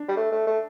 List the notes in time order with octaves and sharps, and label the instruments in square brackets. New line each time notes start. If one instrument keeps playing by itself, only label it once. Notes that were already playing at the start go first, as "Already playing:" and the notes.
Already playing: [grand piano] D4
[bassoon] G3
A3
A3
A3